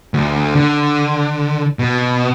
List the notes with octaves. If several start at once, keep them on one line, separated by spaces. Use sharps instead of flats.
D2
D3
B2